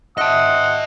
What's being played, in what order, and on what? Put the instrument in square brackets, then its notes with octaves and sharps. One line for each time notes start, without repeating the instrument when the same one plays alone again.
[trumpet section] C4 D#6 [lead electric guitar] D#5 A5 [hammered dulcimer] E5 [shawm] F#5